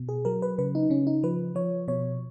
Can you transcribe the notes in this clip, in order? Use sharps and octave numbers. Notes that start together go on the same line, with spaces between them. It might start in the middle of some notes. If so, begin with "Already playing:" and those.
Already playing: B2
G#4
F#3 A#4
B4
C#3 B4
D#4
C#3 C#4
D#4
F3 B4
F3 C#5
B2 C#5